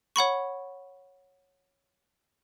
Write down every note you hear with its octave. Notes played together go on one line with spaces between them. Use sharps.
C#5 F#5 B5 C#6